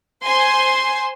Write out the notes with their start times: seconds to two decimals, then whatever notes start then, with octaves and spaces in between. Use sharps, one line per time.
0.24 C5 G#5 C6